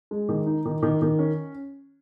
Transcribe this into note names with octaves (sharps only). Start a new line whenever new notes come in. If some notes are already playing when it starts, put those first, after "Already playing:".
G#3
D#3
D#4
D#3
D#3
D#3
C#4